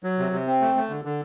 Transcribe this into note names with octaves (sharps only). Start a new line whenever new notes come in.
F#3
C3
C3
C4
A3
A3
D3
D3